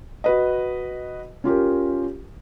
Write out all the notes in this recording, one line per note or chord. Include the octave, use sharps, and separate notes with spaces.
F#4 B4 D#5
C#4 F4 G4 A#4